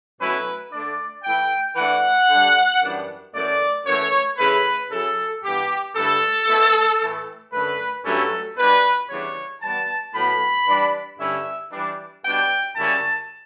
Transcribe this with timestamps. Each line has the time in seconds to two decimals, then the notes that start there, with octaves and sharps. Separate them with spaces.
0.19 B2 F#3 A3 C#4 E4 B4
0.72 D3 A3 D4 D5
1.24 E3 A3 E4 G5
1.76 E3 A3 D4 F#5
2.29 D3 G3 D4
2.82 F#2 E3 G3 D4
3.33 F#2 E3 A3 D5
3.85 F#2 E3 A3 C#5
4.38 C#3 E3 A3 E4 B4
4.90 C#3 F#3 C#4 E4 A4
5.43 G2 E3 B3 G4
5.95 G2 D3 A3 E4 A4
6.47 B2 A3 E4
7.00 A2 E3 A3 E4
7.53 F#2 D3 A3 B4
8.05 G2 F#3 A3 C#4 E4 A4
8.57 B2 G3 D4 B4
9.09 C#3 E3 G3 B3 D4 C#5
9.61 E3 G3 B3 A5
10.14 A2 F#3 B3 B5
10.67 E3 G3 D4
11.19 G2 D3 G3 C#4 E4 E5
11.72 E3 G3 D4
12.24 B2 G3 D4 G5
12.76 F#2 C#3 G3 C#4 E4 A5